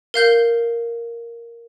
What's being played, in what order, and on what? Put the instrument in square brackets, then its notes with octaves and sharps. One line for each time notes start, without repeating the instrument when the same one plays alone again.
[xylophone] A#4 F5 G6 G7